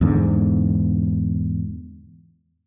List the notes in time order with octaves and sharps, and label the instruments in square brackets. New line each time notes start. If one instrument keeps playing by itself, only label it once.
[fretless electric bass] E2 G#2 D3